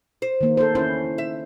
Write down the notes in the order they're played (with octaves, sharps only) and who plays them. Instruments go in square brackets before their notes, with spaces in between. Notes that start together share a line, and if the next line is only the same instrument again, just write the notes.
[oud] C5
[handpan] D#3 A#3
A4 C5
[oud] E2 [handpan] C#4 E4 C5
[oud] E5